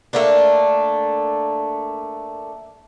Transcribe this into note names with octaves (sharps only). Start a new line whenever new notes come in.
A3 A#3 D4